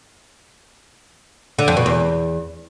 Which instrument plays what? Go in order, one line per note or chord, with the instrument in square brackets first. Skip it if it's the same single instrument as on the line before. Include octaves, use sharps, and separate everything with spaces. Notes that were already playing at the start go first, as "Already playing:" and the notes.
[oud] D3
F2
B2
E2